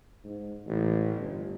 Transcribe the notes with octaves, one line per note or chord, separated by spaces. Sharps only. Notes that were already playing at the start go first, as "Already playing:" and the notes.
G#2
A1
G1